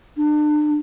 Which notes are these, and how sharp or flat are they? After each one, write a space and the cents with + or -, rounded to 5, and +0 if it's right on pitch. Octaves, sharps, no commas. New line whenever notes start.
D4 +40